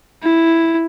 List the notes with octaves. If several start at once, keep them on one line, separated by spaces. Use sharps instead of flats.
E4